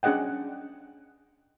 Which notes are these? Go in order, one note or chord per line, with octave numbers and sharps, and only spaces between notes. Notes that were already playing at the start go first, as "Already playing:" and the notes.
C#4 D4 G#4 D#5 F#5 G5